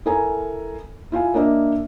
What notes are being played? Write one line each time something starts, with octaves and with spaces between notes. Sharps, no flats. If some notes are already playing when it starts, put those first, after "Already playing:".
E4 A4 A#4 G#5 A#5
E4 F4 F5 G#5
A#3 D4 A#4 D#5 E5